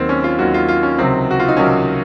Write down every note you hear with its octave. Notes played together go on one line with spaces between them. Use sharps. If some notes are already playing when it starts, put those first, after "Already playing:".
Already playing: D#2 D#3 F#3 C4
C#4
F4
D#2 D#3 F#3 F#4
F4
F4
C#4
C#2 C3 D#3 F#3 C4
F#4
F4
D#4
C#2 C3 D#3 F#3 C#4